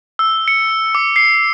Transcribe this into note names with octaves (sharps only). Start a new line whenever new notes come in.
E6
C#7
D6
C7